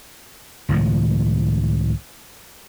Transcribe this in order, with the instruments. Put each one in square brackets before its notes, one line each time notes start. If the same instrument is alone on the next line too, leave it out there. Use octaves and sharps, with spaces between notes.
[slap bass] C#2 A2 D#3 F3